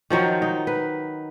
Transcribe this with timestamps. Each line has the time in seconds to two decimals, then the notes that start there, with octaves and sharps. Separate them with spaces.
0.10 D#3 F3 F#3 D#4
0.42 D#4
0.67 B4